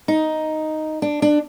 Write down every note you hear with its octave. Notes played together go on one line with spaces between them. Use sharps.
D#4
D4
D4